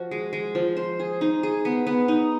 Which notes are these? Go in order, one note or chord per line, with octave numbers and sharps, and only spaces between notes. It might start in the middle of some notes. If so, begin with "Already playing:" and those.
Already playing: F3 F#4
G#3
G#3
F3
C5
G#4
D#4
G#4
B3
B3
D#4